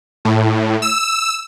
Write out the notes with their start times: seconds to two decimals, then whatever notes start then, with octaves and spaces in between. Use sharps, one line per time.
0.25 A2
0.82 E6